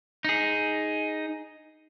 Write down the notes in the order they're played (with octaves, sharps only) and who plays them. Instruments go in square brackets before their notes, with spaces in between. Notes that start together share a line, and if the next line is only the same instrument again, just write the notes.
[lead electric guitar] D#4 G#4